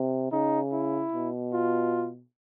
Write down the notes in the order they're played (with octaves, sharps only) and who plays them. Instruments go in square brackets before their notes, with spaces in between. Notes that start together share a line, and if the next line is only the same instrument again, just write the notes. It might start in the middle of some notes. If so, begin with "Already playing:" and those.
Already playing: [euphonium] C3
[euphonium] C#3 [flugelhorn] D#4
[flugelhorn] E4
[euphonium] B2
[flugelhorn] F4